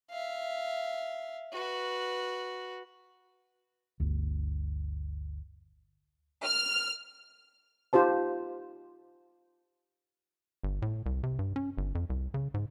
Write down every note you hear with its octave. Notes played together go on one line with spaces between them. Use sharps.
E5 F5
F#4 B4
G1 D2
F6
D#4 F4 G4 C5 A5
G1
A2
C2
C3
G2
C#4
G1
F2
C2
C#3
G#2